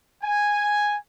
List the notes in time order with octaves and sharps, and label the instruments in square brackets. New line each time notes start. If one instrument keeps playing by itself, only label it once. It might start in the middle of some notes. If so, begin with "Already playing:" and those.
[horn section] G#5